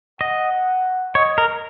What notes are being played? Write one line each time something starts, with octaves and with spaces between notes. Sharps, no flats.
D#5 F#5
C#5 D#5
A#4